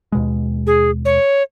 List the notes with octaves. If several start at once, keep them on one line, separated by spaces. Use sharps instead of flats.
D#2 B2 G#3
G#4
C#5